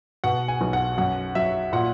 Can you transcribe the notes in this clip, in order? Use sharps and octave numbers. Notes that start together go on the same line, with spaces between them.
B2 F#5
G#5
B1
F#5
F#2 F#5
F#3 E5
A#2 F#5